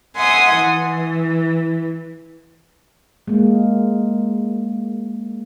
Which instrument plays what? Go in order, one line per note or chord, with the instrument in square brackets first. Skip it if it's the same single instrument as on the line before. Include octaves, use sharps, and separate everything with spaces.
[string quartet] E5 F#5 G#5 C6 D#6
E3
[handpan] G#3 A#3